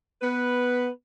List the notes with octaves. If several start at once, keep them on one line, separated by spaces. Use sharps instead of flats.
B3 B4